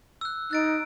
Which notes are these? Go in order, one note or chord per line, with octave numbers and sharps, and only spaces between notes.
E6 F#6
D#4 F#6 A6 D7